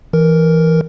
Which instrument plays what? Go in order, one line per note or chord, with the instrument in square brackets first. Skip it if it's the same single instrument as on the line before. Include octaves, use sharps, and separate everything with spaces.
[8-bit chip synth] E3 A#4